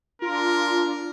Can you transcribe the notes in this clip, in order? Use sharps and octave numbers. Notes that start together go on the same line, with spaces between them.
D4 F4 A#4